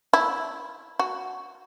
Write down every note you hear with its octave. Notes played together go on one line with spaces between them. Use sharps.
E4
F#4